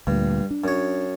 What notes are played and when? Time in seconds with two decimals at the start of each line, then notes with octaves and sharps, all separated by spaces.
0.07 D2 G2 A#2
0.51 D4
0.64 F#2 C#5